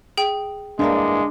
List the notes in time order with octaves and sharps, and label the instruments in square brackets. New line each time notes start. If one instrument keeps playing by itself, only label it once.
[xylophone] G#4 G5
[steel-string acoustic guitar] G2 E3 A#3 [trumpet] G#3 [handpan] D4